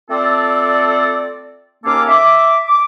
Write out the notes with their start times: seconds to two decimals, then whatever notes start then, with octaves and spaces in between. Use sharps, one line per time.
0.10 A3 C4 F4 A4 D5
1.84 D#2 A#3 C#4 A4 F5 D6
2.08 E5 D6
2.67 D6